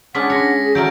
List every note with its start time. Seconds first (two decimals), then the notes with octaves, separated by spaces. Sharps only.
0.15 G#3 C#4 D4 F#5 B6
0.30 C#5 A#6 B6 C#7
0.62 G#4
0.75 F#3 A3 C#4 A#5 G6 D7